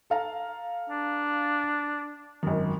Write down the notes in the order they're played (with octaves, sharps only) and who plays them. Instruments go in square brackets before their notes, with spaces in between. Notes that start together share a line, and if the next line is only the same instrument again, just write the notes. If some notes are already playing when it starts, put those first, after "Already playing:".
[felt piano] A4 F5 A#5
[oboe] D4
[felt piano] G#1 F#2